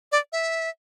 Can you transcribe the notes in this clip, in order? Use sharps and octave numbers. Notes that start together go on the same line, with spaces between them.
D5
E5